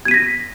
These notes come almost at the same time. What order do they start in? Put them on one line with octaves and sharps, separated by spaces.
G#6 D#7 B6 A#6